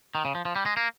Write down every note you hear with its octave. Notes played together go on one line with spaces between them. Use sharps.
D#3
C#3
F3
F3
G3
G#3
A#3